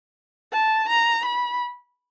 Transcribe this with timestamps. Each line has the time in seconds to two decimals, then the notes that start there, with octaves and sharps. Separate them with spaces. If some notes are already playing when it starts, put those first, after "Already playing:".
0.53 A5
0.89 A#5
1.25 B5